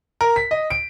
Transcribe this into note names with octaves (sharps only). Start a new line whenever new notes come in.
A#4
B6
D#5
D7